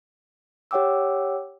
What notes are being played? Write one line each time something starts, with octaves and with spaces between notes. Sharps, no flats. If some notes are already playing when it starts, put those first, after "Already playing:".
G4 C#5 F#5 G5 D6 E6